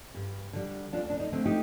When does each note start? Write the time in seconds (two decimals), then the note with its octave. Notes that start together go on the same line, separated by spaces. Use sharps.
0.14 G2
0.53 D3 G3
0.93 D2 D4 F4
1.10 D4
1.20 D#4
1.32 D3 A3 C4
1.46 D#4 G4